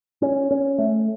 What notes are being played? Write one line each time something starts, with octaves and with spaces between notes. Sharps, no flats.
C#4
C#4
A3